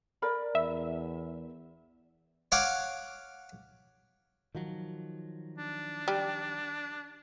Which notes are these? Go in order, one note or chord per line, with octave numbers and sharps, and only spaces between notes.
A#4 D5 B5
E2 E5
C#5 F5 F#5 D6
D#3 F3 F#3
D4
G3